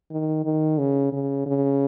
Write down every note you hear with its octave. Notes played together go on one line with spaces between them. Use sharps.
D#3
D#3
C#3
C#3
C#3